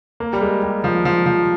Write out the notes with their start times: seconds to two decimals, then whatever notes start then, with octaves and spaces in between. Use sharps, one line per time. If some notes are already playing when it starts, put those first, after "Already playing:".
0.20 A#3
0.33 G3
0.41 G#3
0.63 G3
0.84 F3
1.05 F3
1.26 F3